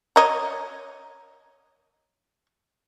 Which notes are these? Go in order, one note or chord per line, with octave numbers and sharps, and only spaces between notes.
C#5 D#5 A#5